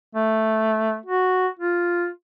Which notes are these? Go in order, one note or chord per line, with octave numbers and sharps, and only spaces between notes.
A3
F#4
F4